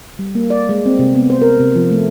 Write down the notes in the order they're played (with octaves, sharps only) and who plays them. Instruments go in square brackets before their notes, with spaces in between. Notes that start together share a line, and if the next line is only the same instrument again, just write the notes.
[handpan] G3
A#3
D5
G#3
C4
C3
B3
C5
A#4
C3
F3
A3